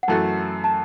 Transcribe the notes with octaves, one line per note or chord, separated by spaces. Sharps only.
F#5
F#2 E3 A3 F#4 A4 A5
A5